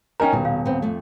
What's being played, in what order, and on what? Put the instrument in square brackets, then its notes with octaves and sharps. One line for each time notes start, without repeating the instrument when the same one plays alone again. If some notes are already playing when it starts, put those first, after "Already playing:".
[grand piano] C#4 D#4 A#4 [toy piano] G5 G#5 A#5
[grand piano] D#1 [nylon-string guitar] B2
[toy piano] F5
[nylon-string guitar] B3 C4
F2 A3